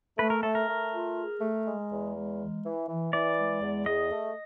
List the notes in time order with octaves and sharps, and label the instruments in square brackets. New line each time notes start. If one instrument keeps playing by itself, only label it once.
[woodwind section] A3 [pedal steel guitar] B4
[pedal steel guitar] A#4
[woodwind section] A3 [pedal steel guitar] A4
[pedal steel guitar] A#4
[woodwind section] A3
F4
G#4
A3
G#3
E2
G#3
E3
E3
E3
[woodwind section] E3 [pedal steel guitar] D5
[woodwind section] G#3
E2
[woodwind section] G#4 [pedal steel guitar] D#5
[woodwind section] A3